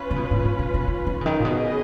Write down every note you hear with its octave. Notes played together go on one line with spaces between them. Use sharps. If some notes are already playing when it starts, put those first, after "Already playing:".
Already playing: C#4 F4 B4
C#3
B2
G#2
A#2
A#2
B2
D#3
D#3
C#3
D#3
A#2
B2 C#4 G#4 B4 D#5